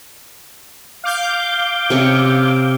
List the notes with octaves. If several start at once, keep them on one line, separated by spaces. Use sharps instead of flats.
F5 D6 G6
C3 C#4 C#6